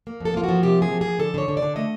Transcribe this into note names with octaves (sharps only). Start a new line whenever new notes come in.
A#3
F2 A4
A#3 F4
F3 F#4
C3 G4
A#3 G#4
F3
F3 G#4
D3 A4
D3 C#5
D3
D5
D3
A3 D#5